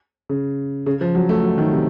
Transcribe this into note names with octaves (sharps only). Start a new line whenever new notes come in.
C#3
C#3
F3
F#3
A3
F#3
D#3
C3